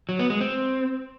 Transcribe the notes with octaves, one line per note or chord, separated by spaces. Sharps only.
F#3
B3
G#3
C4